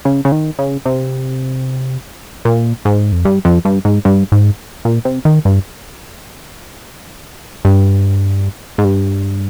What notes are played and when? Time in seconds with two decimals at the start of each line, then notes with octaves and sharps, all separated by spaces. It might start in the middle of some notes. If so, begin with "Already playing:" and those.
0.05 C#3
0.25 C#3
0.32 D#3
0.59 C#3
0.86 C3
2.45 A#2
2.85 G#2
3.12 F2
3.25 G2
3.45 F2
3.65 G2
3.85 G#2
4.05 G2
4.32 G#2
4.85 A#2
5.05 C3
5.25 D#3
5.45 G2
7.65 G2
8.78 G#2
8.85 G2